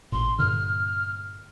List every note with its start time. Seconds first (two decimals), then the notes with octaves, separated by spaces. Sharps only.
0.12 A1 A#2 C6
0.39 G2 A#2 D3 F6